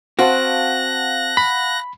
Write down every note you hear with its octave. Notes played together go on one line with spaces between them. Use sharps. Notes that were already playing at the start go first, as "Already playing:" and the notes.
C4 F#4 F5 F#5 A5 F#6 A#6
B5